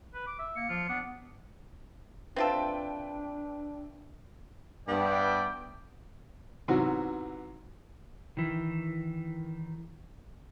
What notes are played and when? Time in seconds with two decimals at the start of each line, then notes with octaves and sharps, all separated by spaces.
0.14 B4
0.27 D6
0.39 E5
0.56 A#3 C#7
0.69 F3 F4
0.89 B3 D4
2.36 C4 D4 F4 A4 B4 E5 G5
4.88 G2 B3 D5 E5 G5
6.68 G#2 C3 E3 F#3 B3 F#4
8.37 D#3 E3